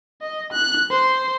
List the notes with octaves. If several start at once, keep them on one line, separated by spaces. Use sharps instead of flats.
D#5
F#6
C5